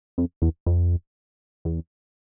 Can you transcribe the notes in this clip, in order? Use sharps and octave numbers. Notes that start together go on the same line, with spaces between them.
F2
E2
F2
E2